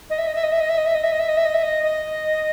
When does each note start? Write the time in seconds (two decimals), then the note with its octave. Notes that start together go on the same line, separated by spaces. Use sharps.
0.10 D#5
0.18 E5
0.27 D#5
0.35 E5
0.43 D#5
0.52 E5
0.60 D#5
0.69 E5
0.78 D#5
0.86 E5
0.95 D#5
1.03 E5
1.12 D#5
1.20 E5
1.28 D#5
1.37 E5
1.45 D#5
1.54 E5
1.63 D#5
1.84 D#5